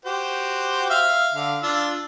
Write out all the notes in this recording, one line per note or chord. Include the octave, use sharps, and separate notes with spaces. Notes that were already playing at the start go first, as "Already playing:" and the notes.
F#4 G4 C5
E5 F5 F6
D3 F5
D4 F4 E6